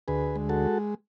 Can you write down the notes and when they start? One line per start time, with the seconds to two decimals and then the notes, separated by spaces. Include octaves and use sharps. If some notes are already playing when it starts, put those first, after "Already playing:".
0.08 D2 G#4 B4
0.36 G#3
0.49 F#4 A4